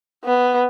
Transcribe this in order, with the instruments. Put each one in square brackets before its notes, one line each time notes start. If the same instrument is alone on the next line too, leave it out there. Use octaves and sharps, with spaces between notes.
[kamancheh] B3